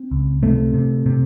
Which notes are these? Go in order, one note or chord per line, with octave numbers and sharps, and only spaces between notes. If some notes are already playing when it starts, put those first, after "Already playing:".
Already playing: C4
C#2
C3 A3
C3
C3